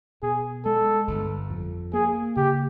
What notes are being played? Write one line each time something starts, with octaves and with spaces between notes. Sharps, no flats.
B2 G#4
G#3 A4
G1
F2
A#3 G#4
C#3 G4